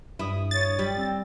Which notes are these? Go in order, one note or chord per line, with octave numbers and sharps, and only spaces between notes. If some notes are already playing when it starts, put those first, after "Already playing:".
G2 E4 D#6
C#5 A6
G3
C4